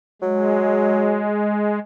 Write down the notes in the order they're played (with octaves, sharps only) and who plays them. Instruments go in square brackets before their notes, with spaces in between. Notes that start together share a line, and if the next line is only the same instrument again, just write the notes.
[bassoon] F#3 [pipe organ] G#3